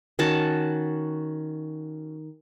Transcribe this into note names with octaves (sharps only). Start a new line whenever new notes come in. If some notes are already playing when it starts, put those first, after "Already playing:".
D#3 C#4 F#4 A5